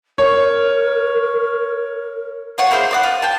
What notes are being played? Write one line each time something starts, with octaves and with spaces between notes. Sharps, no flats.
A#4 C#5
F4 C#5 F#5
A#3 E4 G#4 C5
C5 D5 F#5
F4
G5 A5